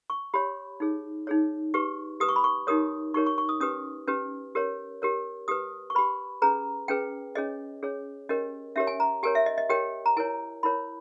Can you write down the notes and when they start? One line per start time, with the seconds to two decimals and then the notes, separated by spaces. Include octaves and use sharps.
0.10 C#6
0.34 G4 C#5 B5
0.80 D#4 G#4 C#5
1.27 D#4 G#4 C#5
1.74 G4 B4 C#6
2.20 G4 B4 D#6
2.29 C#6
2.36 B5
2.44 C#6
2.67 D#4 G4 A#4 C#5 D#6
3.14 D#4 G4 A#4 C#5 C#6
3.27 C#6
3.38 C#6
3.49 D#6
3.60 C#4 G4 B4 D#6
4.07 C#4 G4 B4
4.55 G4 A#4 C#5
5.02 G4 A#4 C#5
5.48 G4 B4 D#6
5.90 C#6
5.95 G4 B4 B5
6.42 C#4 G#4 B4 A#5
6.88 C#4 G#4 B4 G5
7.35 C#4 G#4 C#5 D#5
7.83 C#4 G#4 C#5
8.29 C#4 G4 A#4 C#5 D#5
8.76 C#4 G4 A#4 C#5 E5
8.87 G#5
9.00 A#5
9.23 G4 A#4 C#5 G#5
9.35 E5
9.46 D#5
9.58 D#5
9.69 G4 A#4 C#5 G5
10.06 A#5
10.17 E4 A#4 C#5 G#5
10.63 E4 A#4 C#5 B5